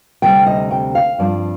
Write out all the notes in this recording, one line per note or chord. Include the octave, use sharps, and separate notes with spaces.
D2 C3 G3 C4 G5
D#5
G5
F5
G2 F3 C4 D5